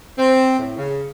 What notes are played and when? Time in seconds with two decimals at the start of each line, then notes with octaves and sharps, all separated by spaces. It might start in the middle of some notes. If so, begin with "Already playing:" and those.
0.18 C4
0.59 A2
0.77 C#3